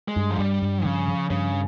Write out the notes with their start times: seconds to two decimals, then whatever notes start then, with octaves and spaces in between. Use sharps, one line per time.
0.08 G#3
0.16 G2
0.31 F3
0.38 G2 G3
0.62 G2
0.85 C#3 F3
1.08 F3
1.30 G2 C#3